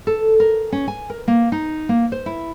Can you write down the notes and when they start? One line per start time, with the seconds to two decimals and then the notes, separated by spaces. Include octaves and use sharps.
0.07 A4
0.40 A#4
0.72 C#4
0.88 G#5
1.10 A#4
1.28 A#3
1.52 D#4
1.89 A#3
2.12 C5
2.26 E4